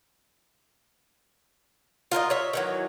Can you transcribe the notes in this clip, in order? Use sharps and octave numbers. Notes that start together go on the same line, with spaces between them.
F4 A#4 C5 D#5
C#5 E5
D#3 E3 F#3